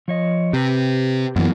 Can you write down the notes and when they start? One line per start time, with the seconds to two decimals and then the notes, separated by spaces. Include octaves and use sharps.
0.08 F3 C#5 D#5
0.53 C3 G4 B4
1.36 F#2 E3 F#3 A#3 B3